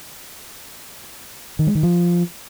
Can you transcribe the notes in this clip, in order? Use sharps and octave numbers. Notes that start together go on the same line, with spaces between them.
D#3
G#3
D#3
F3